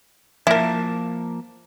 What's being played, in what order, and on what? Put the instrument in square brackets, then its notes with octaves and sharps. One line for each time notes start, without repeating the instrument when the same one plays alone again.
[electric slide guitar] F3 A#3 A5 [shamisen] E4 A#4